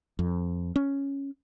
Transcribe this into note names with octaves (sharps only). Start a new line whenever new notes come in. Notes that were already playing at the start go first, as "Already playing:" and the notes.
F2
C#4